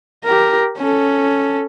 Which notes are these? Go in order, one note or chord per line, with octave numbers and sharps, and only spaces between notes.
G4 A#4
C#4 A4